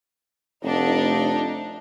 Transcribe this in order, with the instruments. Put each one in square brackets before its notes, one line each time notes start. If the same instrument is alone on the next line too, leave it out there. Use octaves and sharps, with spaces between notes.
[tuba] F1 [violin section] D4 D#4